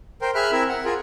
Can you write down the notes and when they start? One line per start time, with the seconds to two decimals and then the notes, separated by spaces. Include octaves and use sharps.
0.22 A#4 C5 G5
0.35 G#4 E5 B5 F6 F#6
0.52 C4 E4 A#4 E5
0.69 F#5
0.85 F4 G#4 A#4